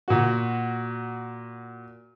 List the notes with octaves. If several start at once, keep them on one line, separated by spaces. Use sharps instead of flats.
A#2 F#4